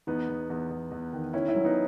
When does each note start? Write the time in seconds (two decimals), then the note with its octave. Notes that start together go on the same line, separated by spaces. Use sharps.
0.07 E2 B3 D#4
0.29 E2
0.50 E2
0.70 E2
0.91 E2
1.13 D#3
1.33 D#3 C#4 E4
1.48 C#4 E4
1.55 F#3
1.64 B3 D#4